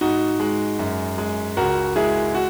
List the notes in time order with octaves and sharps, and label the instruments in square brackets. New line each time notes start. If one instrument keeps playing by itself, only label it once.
[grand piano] G#2 D#4 F#4
G#3
F#2
G#3
C#2 F#4 A#4
G#3 E4 G#4
F#4